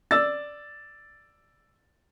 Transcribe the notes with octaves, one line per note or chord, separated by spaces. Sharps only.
D5 E6 A6